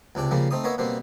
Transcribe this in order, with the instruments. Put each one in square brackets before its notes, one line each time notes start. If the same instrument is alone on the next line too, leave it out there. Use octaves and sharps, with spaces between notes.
[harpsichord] C#2 C3 D4 G5
C#3 F3 G3 A#3
A3 C4 D#4 D#6
A#3 B3 C#5 D#5 E5
B2 G3 A#3 C4